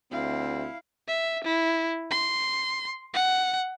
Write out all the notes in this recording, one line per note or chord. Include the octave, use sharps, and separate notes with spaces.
D2 C4 E4 F5
E5
E4
C6
F#5